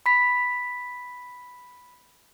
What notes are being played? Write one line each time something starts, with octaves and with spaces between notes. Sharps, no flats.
B5 B6